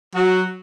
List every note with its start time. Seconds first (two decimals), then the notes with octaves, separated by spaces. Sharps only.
0.15 F#3 F#4